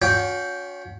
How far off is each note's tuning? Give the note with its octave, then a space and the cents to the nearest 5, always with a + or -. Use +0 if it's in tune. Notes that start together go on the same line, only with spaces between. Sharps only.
C#4 +30 F#4 -35 G5 +0